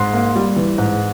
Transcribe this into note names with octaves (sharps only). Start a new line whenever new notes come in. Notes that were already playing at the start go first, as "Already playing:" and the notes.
Already playing: G#2 C6
A#3
G3
E3
G#2